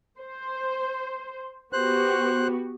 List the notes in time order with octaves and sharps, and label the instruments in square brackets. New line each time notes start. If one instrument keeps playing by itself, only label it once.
[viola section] C5
[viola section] B3 F#4 G4 [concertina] C5 F#6